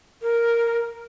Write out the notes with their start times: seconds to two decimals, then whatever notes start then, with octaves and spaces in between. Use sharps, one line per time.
0.22 A#4